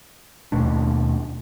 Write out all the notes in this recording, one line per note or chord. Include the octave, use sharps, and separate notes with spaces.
D#2 B2 A3 D4